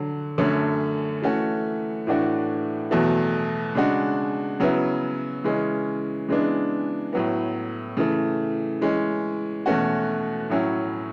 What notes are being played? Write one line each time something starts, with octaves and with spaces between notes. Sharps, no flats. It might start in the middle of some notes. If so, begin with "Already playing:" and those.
Already playing: D3 F#3
F#2 D3 A3 C#4
E3 A3 C#4 F#4
A2 E3 A3 D4 F#4
E2 B2 F#3 A3
C#3 G#3 D4 F#4
C#3 F#3 B3 E4
C#3 E3 G#3 C#4
C#3 E3 G#3 B3 D4
A2 F#3 B3
C#3 E3 A3
E3 G#3 C#4
E2 B2 A3 C#4 F#4
A2 F#3 C#4 E4